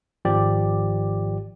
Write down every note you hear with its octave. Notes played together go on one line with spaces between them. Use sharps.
G#1 F3 G4 D5